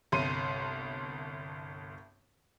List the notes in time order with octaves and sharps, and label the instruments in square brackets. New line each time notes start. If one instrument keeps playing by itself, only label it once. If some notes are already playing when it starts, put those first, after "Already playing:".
[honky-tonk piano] G1 C2 C6 D#7